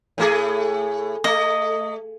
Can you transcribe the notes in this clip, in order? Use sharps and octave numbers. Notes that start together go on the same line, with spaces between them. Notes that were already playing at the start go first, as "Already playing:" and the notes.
A2 A3 G#4
A3 D#5